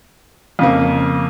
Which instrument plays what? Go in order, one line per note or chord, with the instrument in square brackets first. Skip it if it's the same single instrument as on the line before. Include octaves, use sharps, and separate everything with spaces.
[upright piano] F2 C#3 A#3